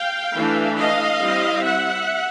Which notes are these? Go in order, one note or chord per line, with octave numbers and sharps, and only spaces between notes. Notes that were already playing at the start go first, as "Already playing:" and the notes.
Already playing: F5 G5
E3 A3 D4
D#5 F5
G3 C4 E4
E5 F#5